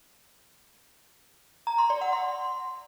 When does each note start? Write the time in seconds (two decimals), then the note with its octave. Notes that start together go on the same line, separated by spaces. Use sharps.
1.67 A#5
1.78 C6
1.90 D5
2.01 F#5
2.13 C6